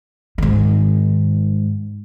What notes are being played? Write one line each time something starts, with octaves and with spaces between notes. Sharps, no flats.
G#2 D#3